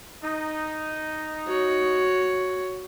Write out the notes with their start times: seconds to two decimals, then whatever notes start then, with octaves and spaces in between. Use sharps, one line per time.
0.23 D#4
1.46 F#4 C#5